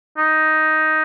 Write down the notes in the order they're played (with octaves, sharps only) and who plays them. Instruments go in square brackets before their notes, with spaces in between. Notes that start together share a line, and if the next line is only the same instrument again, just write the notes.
[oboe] D#4